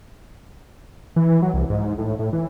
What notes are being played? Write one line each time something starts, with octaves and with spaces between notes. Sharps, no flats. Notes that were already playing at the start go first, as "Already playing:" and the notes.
E3
F#3
C2
G#2
A2
A2
E3